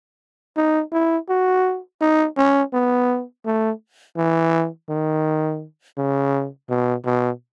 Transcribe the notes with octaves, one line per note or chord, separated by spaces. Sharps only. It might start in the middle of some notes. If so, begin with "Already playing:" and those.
D#4
E4
F#4
D#4
C#4
B3
A3
E3
D#3
C#3
B2
B2